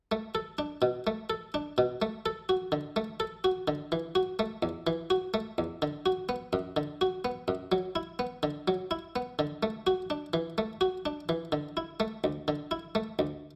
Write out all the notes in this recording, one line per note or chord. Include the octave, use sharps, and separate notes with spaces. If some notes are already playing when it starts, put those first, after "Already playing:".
A3
A4
D4
B2
A3
A4
D4
B2
A3
A4
F#4
D3
A3
A4
F#4
D3
E3
F#4
A3
E2
E3
F#4
A3
E2
D3
F#4
B3
F#2
D3
F#4
B3
F#2
F#3
E4
B3
D3
F#3
E4
B3
D3
A3
F#4
D4
E3
A3
F#4
D4
E3
D3
E4
A3
D2
D3
E4
A3
D2